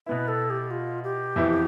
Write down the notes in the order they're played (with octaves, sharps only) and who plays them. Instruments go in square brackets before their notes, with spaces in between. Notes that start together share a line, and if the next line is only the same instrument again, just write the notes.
[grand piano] B2 B3 E4 [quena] B4
[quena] A4
G4
F4
G4
[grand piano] F2 E3 B3 E4